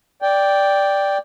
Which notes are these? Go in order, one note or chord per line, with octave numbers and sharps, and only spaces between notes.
D5 G5